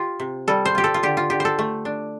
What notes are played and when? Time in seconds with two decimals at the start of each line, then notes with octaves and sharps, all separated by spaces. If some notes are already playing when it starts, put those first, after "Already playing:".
Already playing: F4 G4
0.20 C3
0.48 G3 A4
0.65 C5
0.75 F4 G4
0.84 A4
0.94 F4
1.03 D3 G4
1.17 F4
1.30 D3 G4
1.40 A4 C5
1.59 A3
1.85 D4